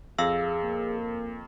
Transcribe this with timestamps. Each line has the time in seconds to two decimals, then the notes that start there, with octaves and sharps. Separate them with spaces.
0.18 F2 G#4 F5 E6
0.63 A#3